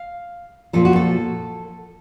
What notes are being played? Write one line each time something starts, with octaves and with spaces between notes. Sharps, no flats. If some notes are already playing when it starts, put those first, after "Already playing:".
Already playing: F5
A#2 F3 A4
F#4
A4